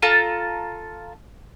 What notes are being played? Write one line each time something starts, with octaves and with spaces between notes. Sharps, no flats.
F4 A4 A5 A#5